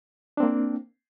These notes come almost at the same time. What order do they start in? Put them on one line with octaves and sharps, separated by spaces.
D4 C4 A#3